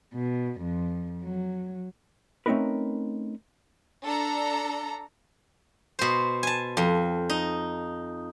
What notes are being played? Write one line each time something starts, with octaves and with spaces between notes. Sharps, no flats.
B2
F2
F#3
A3 C4 C#4 D#4 A#4 B4
D4 A4 A#5
B2 C5
G#5 A5
F2
D#4